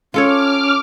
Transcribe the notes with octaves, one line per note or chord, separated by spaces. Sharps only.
C#4 F4 A4 C#5 D6 F6